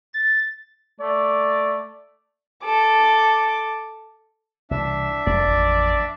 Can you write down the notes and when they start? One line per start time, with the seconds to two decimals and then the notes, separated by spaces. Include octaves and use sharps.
0.14 A6
1.00 A3 D5
2.64 A4 D6
4.71 C2 B2 E3 D4 E5
5.27 F1 F2 A#3 D5
5.47 A1